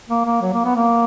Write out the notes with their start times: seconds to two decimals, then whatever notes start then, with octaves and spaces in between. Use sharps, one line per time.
0.09 A#3
0.25 A#3
0.42 F#3
0.53 A#3
0.65 B3
0.75 A#3